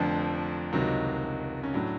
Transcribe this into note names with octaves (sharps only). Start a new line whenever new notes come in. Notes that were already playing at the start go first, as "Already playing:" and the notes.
Already playing: F1 F2 D3 F3 D4
C#2 C3 D#3 F#3
C#4
A2 F#3 D4